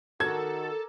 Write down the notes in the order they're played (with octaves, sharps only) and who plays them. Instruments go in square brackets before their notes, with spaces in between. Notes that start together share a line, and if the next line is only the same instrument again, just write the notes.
[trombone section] D#3 F#4 [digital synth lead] A4 [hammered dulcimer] A#4 D5 A#5 [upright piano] G#6